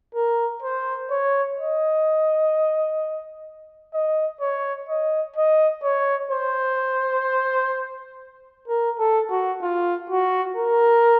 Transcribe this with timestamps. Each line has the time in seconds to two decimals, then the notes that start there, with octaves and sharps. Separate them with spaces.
0.15 A#4
0.62 C5
1.11 C#5
1.58 D#5
3.94 D#5
4.41 C#5
4.89 D#5
5.36 D#5
5.83 C#5
6.31 C5
8.68 A#4
8.99 A4
9.30 F#4
9.62 F4
10.10 F#4
10.57 A#4